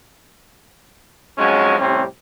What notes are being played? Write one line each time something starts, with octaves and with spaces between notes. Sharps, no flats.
F2 G#2 F#3 G#3 C#4
A2 C3 G3 C4 C#4